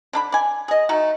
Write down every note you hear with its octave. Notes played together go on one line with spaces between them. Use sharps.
D3 D4 B5
D5 G#5
G#4 D#5
A3 D#4 F#4